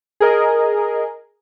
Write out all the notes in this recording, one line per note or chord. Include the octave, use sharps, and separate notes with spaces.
G#4 A#4 D#5